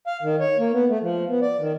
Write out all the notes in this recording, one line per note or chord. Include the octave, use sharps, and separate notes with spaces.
F5
D#3
C#5
A#3
B3
A3
F3
B3
D5
D#3